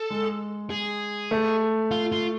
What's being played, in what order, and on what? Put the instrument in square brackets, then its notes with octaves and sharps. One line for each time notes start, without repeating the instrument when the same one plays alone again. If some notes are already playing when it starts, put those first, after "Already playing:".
Already playing: [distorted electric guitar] A4
[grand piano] G#3
[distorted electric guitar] G#4
[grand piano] A3
[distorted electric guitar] F4
F4